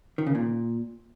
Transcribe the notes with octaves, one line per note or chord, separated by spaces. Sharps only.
D#3
C#3
A#2